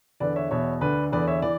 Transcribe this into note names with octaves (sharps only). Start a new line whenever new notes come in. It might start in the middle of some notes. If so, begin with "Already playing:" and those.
E2 D3 B4 D5
C#5 E5
E2 B2 C#5 E5
D2 D3 B4 D5
E2 D3 B4 D5
C#5 E5
E3 D5